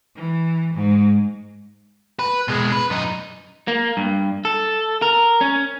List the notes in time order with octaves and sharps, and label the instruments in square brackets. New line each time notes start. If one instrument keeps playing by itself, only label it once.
[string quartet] E3
G#2
[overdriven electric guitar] B4
B2 G#3
B4
F#2 D#4
[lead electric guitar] A#3
G2
A4
A#4
C#4